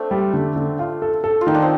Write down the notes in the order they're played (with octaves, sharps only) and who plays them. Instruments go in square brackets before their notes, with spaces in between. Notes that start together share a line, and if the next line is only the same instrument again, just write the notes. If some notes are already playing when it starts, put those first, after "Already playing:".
Already playing: [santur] A3 C4 D4
[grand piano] G3
D3
D3
F4
A4
A4
[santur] F4
[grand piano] D#3 [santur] D#4
[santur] D4
C4